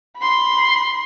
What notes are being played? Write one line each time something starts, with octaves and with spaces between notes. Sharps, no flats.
B5 C6